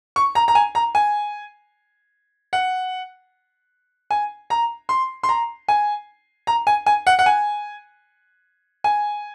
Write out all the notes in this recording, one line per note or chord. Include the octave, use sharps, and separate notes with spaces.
C#6
A#5
A#5
G#5
A#5
G#5
F#5
G#5
A#5
C6
C6
A#5
G#5
A#5
G#5
G#5
F#5
F#5
G#5
G#5